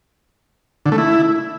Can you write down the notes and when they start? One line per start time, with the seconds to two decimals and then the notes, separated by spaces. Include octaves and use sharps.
0.86 D3
0.92 A3
0.98 E4